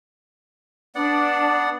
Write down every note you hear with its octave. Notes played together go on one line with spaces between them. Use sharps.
B3 D4 D5 F#5